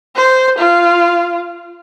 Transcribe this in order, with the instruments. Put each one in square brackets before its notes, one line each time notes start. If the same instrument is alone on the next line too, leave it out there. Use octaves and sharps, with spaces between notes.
[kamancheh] C5
F4